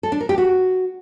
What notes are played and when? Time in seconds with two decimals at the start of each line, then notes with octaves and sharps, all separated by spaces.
0.03 A4
0.12 D4
0.21 A#4
0.29 G4
0.38 F#4